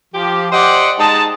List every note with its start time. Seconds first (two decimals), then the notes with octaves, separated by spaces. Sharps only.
0.14 F3 G4
0.52 G4 C5 D5 D#5 F#5
0.99 G#3 D#4 D#5 A5